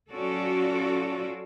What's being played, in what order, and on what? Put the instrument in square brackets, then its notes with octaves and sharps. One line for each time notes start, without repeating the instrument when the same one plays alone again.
[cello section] F#3 C#4 F4 F#4 A4 D5